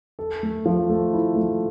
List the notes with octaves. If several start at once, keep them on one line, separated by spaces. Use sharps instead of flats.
A4
A3
F3
A3
E4
A3